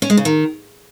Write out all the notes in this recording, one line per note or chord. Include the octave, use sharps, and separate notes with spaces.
C#4
G#3
C#3
D#3